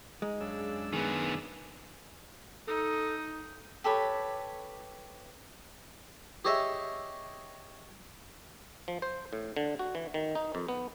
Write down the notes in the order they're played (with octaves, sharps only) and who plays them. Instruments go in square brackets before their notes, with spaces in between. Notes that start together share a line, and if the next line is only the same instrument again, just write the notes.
[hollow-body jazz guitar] G#3 [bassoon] D#4
[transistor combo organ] F#2 D4 E6 [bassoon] C#3
[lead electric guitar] D#3 B3 [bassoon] G#4
[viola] D#4 [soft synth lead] A4
[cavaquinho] G4 A4 B4 C#5
[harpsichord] G4 G#4 C#5 D#5 E5
[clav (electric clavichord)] F3
C5
A2
D3
F#4
E3
D#3
D#4
F2
B3